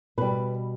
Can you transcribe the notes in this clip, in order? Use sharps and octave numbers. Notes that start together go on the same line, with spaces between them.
B2 G3 B4